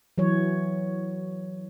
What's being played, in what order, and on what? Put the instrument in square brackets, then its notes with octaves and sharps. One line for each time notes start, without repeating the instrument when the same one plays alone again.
[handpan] E3 F#3 C#5